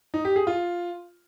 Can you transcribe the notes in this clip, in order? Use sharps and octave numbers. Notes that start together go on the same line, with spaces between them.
D#4
G4
G#4
F4